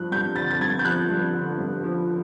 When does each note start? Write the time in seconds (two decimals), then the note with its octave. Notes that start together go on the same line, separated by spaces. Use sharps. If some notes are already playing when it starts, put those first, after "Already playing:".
Already playing: G2 F3 F#6
0.11 G2 G6
0.36 D3 A6
0.51 A6
0.60 G2 G#6
0.79 G6
0.85 F3 F#6
1.10 G2
1.34 D3
1.58 G2
1.83 F3